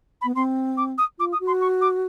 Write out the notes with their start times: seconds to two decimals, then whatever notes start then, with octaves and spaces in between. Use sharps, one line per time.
0.21 B5
0.24 B3
0.35 C4 C6
0.77 D6
0.98 D#6
1.19 F4 D6
1.32 D#6
1.40 F#4
1.47 C6
1.61 C#6
1.81 D6